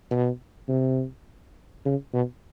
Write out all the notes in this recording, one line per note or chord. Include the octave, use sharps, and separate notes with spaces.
B2
C3
C#3
B2